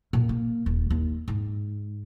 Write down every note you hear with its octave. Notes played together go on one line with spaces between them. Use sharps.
A#2
A#3
D#1
D#2
G#2